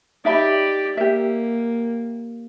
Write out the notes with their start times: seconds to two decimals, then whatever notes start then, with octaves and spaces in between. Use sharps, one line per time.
0.25 D#4 G4 D5 E5 B5
0.97 A#3 G4 E5